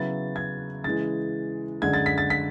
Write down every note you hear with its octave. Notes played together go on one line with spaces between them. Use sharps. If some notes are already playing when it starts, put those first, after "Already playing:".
Already playing: C#3 F#3 B3 E4 A6
G#6
C#3 E3 G#3 A6
F#2 D3 G#3 G#6
A6
B6
A6
B6